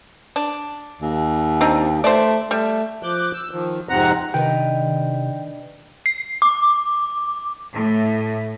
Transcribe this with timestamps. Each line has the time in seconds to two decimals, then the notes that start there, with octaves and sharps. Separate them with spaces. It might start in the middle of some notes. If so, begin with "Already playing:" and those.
0.36 D4
1.01 D#2
1.61 C4 D4 D#4
2.04 A3 C5 D5
2.51 G3 A3
3.03 F3 D6 F#6 G6
3.33 E6
3.51 D#3 F3
3.89 F2 G#2 C3 C4 F#5 A#5
4.34 C3 D#3 D4 D#4 B4 G5
6.06 C7
6.42 D6
7.73 A2